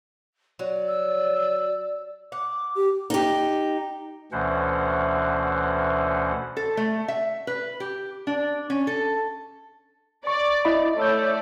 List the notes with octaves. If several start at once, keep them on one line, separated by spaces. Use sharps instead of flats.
F#3 D5
E6
F#5 D6
G4
D#4 G4
D2 B2 E3 C#4 C5 F#5
A4
A3
E5
B4
G4
D4
C#4
A4
D5 C#6
E4 D#5 B5
A3 C#5 D5 E6 G6